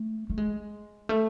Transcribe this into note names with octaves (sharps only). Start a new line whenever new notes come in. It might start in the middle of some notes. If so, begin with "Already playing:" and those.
Already playing: A3
A3
G#3
A3